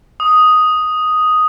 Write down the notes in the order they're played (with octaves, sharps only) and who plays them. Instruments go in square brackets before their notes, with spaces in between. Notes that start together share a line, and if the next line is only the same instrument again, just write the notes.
[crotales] D#6